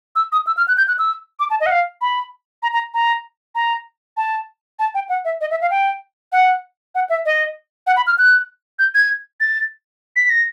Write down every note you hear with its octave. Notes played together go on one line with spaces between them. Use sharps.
E6
D#6
E6
F6
F#6
G6
F#6
E6
D6
A5
D#5
F#5
F5
B5
A#5
A#5
A#5
A#5
A5
A5
G5
F#5
E5
D#5
E5
F5
G5
F#5
F#5
E5
D#5
F#5
B5
F6
F#6
G6
G#6
A6
B6
A#6